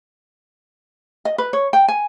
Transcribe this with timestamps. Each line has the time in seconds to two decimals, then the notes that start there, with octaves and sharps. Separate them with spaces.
1.25 D#5
1.38 B4
1.53 C#5
1.73 G5
1.88 G#5